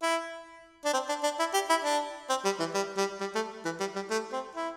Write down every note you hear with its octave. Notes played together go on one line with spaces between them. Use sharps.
E4
D4
C4
D4
D4
E4
G4
E4
D4
C4
G3
E3
G3
G3
G3
A3
E3
G3
G3
A3
C4
E4